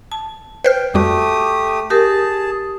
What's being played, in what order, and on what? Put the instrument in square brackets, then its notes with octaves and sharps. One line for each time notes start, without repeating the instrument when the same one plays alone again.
[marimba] A5
[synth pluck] B4 C5 F6 [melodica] G5
[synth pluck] F2 G3 F#4 [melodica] A3 G4 D#6
[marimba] G4 A#4 [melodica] G#4 A5